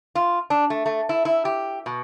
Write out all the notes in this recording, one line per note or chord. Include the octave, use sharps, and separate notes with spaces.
F4
D4
A3
A3
E4
E4
G4
B2